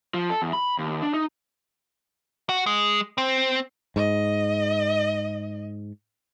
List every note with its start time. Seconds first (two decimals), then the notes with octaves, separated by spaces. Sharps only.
0.14 F3
0.30 A4
0.42 E2
0.53 B5
0.78 D#2
1.02 D4
1.14 D#4
2.49 F#4
2.66 G#3
3.18 C4
3.96 G#2 D#5